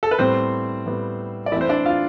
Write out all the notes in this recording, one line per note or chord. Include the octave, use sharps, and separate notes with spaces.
A4
B4
A2 G3 B3 C4 C5
A2 G3 B3
D5
E3 A3 C4 E4 E5
C5
D4 D5
F4 F5